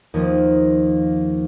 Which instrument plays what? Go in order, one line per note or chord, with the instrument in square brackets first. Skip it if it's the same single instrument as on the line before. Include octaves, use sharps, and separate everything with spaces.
[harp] D#2 F3 A#3